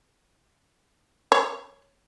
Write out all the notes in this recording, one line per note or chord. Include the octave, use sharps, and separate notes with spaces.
C#5